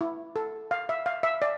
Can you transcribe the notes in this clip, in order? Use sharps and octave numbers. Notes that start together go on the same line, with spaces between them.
E4
A4
F5
E5
F5
E5
D5